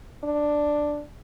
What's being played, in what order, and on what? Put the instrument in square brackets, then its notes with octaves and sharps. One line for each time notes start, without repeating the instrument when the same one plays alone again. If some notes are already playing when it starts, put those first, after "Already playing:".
[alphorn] D4